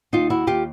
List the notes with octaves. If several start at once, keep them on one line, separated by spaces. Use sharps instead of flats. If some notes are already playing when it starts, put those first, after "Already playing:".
D#2 D#4 F4
E4 F#4
D#2 F4 G4